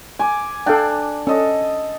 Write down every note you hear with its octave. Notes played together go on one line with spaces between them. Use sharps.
G#5 D6
D4 A4 F5 G5
C#4 A4 D#5